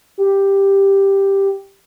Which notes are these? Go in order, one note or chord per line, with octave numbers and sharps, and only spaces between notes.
G4